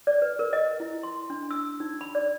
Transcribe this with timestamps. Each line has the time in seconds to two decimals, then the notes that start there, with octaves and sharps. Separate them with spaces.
0.07 D5
0.22 B4
0.39 A#4
0.53 D#5
0.80 E4
1.03 C6
1.30 D4
1.51 E6
1.80 D#4
2.01 B5
2.15 D5